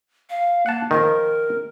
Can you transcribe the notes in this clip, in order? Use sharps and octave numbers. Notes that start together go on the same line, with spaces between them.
F5
A#3 F#5 A5
D#3 F3 A#4